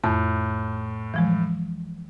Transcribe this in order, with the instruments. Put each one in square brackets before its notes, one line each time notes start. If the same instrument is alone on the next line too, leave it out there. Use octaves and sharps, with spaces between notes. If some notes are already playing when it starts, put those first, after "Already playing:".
[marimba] F2 A5 [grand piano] A2
[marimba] E3 F3 G#3